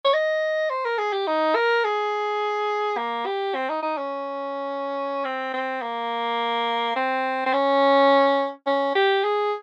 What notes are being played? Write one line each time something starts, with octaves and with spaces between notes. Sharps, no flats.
C#5
D#5
C5
A#4
G#4
G4
D#4
A#4
G#4
A#3
G4
C4
D#4
D#4
C#4
C4
C4
A#3
C4
C4
C#4
C#4
G4
G#4